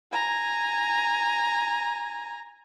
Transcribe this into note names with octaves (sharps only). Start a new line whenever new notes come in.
G#5 A#5